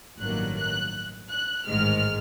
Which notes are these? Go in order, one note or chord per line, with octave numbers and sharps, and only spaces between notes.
A1 G2 D#3 F#3 A#3 F#6
F#6
F#6
A1 G#2 D#3 G#3 F6